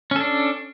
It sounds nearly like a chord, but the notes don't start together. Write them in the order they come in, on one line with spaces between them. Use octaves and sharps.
C#4 A4 D4